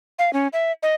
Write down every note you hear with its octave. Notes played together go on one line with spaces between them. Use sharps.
F5
C#4
E5
D#5